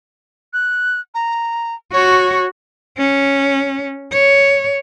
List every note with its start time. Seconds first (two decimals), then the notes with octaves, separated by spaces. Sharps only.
0.53 F#6
1.14 A#5
1.93 F#4 C#5
2.97 C#4
4.12 C#5